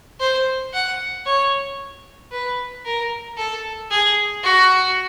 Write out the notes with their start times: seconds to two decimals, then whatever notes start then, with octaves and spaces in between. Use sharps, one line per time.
0.20 C5
0.73 F#5
1.26 C#5
2.32 B4
2.85 A#4
3.37 A4
3.91 G#4
4.43 F#4